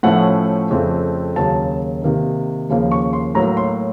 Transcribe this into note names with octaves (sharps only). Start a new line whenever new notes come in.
A2 F3 A3 C#4 F#5
F2 C#3 A3 C4
D#2 C#3 F#3 A#3 A5
C3 D#3 A#3 D#4
D#2 C#3 F3 A#3
C#6
C6
A2 F#3 A#3 A#5
C6